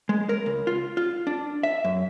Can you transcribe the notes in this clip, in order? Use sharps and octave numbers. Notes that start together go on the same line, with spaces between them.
G#3
A#4
C#2
F4
F4
D4
E5
F#2